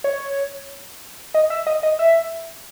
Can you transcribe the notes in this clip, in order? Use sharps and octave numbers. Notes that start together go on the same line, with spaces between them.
C#5
D#5
E5
D#5
D#5
E5